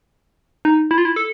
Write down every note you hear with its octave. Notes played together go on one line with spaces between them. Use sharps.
D#4
E4
F4
E4
A4